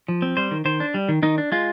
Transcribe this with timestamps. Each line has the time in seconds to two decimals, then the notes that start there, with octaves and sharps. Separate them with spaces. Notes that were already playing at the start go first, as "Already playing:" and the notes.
0.08 F3
0.22 C4
0.37 G3 C5
0.51 D#3
0.65 D#3 C5
0.80 D4
0.94 G3
1.09 D#3
1.23 D#3 D#4
1.38 D4
1.52 G#3 F4